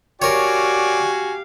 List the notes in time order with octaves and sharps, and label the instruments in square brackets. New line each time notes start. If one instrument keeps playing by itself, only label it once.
[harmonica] F#4 G#5 [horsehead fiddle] G4 F5 [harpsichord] A#4 C#5 [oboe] D5